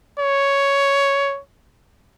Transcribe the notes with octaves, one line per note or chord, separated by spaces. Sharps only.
C#5